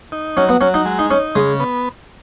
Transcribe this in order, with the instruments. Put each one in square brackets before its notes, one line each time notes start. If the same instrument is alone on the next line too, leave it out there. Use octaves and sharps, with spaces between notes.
[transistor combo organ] D#4
[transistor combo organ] F#3 [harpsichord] C#4
[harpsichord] B3
[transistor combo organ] F#3 [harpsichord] C#4
[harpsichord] D#4
[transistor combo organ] G#3
[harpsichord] D#4
[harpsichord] C#4 [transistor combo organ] D#4
[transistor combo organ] C#3 [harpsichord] G#3
[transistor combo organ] B3